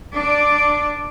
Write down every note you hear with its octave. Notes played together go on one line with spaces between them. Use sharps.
D4 D5